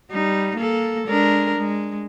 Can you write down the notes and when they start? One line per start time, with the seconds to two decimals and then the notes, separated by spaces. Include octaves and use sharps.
0.10 G3 D#4
0.56 A#3 A4
1.07 G#3 D4 A#4
1.57 G#3